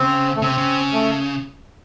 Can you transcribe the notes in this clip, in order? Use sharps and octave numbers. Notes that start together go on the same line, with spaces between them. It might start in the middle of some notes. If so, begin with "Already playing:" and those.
Already playing: C#3 C4
A3
C#3 C4
C3
C#3
A3